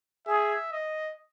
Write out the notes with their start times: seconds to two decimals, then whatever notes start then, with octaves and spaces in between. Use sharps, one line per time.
0.27 G#4 E5
0.73 D#5